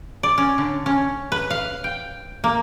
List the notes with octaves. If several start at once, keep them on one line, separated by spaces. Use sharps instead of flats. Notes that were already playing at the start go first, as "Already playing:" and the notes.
D5
C#4
D3
C#4
B4
F5
G5
A#3